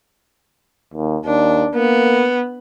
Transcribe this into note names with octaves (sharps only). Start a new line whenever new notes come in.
D#2
D#2 D4
A#3 B3